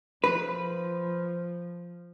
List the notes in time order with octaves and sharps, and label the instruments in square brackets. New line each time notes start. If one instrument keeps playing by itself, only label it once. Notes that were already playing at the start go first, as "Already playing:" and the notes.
[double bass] F3 [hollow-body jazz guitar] B4